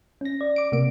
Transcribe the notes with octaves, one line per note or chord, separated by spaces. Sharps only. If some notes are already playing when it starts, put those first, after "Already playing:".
C#4 A#6
D5
D6 D7
C3 A#3 D7